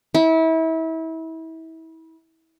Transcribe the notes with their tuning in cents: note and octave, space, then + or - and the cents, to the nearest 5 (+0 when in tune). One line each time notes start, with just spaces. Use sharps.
E4 -30